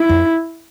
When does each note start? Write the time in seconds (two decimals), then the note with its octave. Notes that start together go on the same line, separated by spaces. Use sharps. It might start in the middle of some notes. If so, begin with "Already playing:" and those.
Already playing: E4
0.09 F2